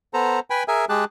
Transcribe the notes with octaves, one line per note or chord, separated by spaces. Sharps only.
B3 A4 C5 A#5
B4 G5 G#5 B5
G#4 A#4 E5 G#5
G#3 G4 G#4 A5 F#6